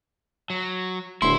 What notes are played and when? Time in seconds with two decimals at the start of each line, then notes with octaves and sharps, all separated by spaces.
0.50 F#3
1.22 D1 E4 C6